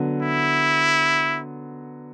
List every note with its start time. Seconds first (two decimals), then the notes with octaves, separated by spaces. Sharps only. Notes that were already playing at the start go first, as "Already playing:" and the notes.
Already playing: D3 F#3 B3
0.22 E4